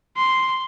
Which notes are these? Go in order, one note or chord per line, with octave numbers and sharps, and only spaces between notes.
C6